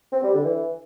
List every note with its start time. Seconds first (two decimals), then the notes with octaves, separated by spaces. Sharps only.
0.13 C4
0.23 G3
0.34 D3
0.45 E3